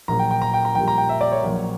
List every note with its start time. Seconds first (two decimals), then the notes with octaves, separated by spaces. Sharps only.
0.08 A#1 A#2 F#3 A#5
0.19 G5
0.31 G5
0.42 A#5
0.54 G5
0.65 A#5
0.75 A#1 A#2 G3 G5
0.88 A#5
0.98 G5
1.09 E5
1.21 D5
1.32 C#5
1.43 A#1 A#2 F#3